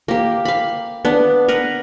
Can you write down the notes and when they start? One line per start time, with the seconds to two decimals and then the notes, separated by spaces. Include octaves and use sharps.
0.08 A#3 G4
0.45 F5 B5
1.05 B3 D4
1.48 A#4 B4 F#5